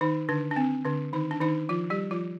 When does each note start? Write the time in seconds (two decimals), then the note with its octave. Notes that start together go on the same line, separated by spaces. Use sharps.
0.01 D#3 D#4
0.29 D3 D4
0.51 D4
0.56 C4
0.85 D3 D4
1.13 D#3 D#4
1.31 D4
1.41 D#3 D#4
1.69 F3 F4
1.90 G3 G4
2.11 F3 F4